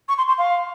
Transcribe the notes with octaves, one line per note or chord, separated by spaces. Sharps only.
C#6
C6
C6
F5